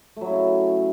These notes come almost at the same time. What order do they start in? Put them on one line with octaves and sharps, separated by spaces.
A3 F#3 E4 C#3